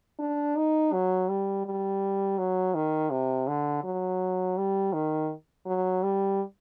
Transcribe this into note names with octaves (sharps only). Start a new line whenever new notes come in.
D4
D#4
F#3
G3
G3
F#3
D#3
C3
D3
F#3
G3
D#3
F#3
G3